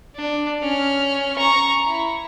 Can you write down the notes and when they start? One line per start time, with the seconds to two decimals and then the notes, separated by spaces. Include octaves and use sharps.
0.16 D4
0.63 C#4 F6
1.37 A#5 C#6
1.86 E4